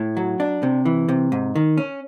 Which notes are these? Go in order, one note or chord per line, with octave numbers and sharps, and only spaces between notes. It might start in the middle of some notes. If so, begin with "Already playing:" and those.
Already playing: A2
F#3
D4
C3
E3
C3
G#2
D#3
C#4